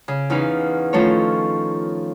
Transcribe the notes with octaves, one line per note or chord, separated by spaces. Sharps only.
C#3
E2 C#4 D#4 B4 F5
D#3 F3 A3 C#4 A4 C#5